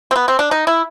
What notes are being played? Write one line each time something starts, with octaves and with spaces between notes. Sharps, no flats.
C4
B3
C4
D4
D#4
E4